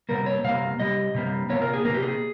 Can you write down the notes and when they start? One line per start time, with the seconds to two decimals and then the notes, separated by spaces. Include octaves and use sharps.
0.09 C3 G3 A#3 A#4
0.26 C#5
0.44 C3 G3 A#3 F5
0.80 C3 G3 D#5
1.15 C3 G3 A#3
1.50 C3 D#3 A#3 C#5
1.62 A#4
1.74 G#4
1.85 C3 D#3 A#3 A#4
1.94 G4
2.02 G#4